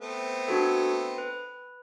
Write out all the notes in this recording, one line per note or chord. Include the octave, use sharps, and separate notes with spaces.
A3 B3 C4
D4 F#4 A4
B4